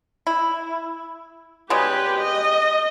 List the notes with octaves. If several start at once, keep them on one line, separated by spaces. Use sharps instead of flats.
E4
C#3 G3 G#3 G4 B4
D#5